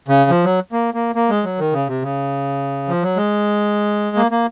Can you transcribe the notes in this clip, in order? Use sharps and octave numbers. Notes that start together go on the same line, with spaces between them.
C#3
F3
F#3
A#3
A#3
A#3
G#3
F#3
D#3
C#3
C3
C#3
F3
F#3
G#3
A#3
A#3